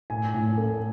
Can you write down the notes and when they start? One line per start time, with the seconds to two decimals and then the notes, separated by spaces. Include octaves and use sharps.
0.10 A2 G#5
0.34 A2
0.57 A3